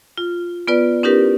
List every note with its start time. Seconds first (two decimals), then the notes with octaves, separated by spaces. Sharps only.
0.18 F4
0.68 B3 F4 B4 D5
1.03 C#4 D#4 E4 G4 A#4 B4